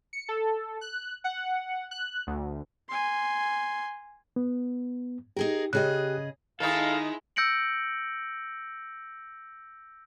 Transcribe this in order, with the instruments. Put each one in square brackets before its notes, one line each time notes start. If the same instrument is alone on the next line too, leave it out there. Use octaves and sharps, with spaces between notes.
[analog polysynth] C#7
A4
F#6
F#5
F#6
D2
[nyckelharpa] G#5 C6
[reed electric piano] B3
[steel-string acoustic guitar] D#4 G#4 A#4 [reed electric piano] G4
[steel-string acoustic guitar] C#3 G#4 D#5 [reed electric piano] G4 F#6
[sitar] D#3 D#4 [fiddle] G#3 E4 [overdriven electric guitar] A4 [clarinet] F5
[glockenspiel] E6 G6 A#6 C#7 D7 F#7